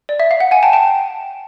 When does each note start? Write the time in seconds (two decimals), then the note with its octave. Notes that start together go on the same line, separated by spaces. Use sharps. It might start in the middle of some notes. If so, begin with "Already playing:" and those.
0.09 D5
0.20 E5
0.31 F5
0.40 F#5
0.51 F#5 G#5
0.63 G5 A5
0.73 G5 A5